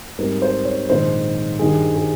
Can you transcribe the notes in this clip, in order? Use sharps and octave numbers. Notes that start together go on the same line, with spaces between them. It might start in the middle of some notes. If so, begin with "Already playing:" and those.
G#2 G3 C4 A#4
C5
C#5
A#1 G#2 D#3 G#3 C5
G2 D#3 G3 G#4
G#4